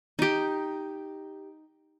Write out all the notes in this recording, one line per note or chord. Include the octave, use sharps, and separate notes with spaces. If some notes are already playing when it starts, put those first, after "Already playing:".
D#4 G4